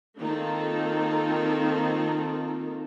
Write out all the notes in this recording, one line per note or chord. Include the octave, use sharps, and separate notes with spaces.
D#3 A#3 C4 D#4 F4 A4